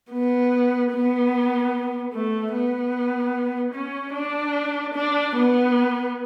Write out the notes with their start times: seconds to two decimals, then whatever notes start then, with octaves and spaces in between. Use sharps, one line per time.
0.11 B3
0.91 B3
2.13 A3
2.53 B3
3.74 C#4
4.14 D4
4.94 D4
5.36 B3